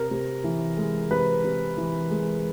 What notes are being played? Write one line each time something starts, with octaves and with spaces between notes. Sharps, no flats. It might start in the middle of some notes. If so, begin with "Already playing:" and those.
Already playing: C3 A#4
C3
E3
G#3
C3 B4
C3
E3
G#3